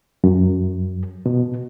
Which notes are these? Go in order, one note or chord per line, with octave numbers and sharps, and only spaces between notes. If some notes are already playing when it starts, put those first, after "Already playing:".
F#2
B2